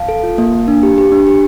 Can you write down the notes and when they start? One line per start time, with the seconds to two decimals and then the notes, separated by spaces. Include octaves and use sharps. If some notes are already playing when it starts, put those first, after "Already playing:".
Already playing: F5 A5
0.09 A4
0.23 F4
0.38 A#3
0.53 A#3
0.68 D4
0.83 G4
0.98 G4
1.12 D4
1.27 G4